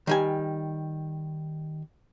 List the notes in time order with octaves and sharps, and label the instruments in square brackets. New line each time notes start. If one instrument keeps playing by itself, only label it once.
[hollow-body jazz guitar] D#3 G3 G#5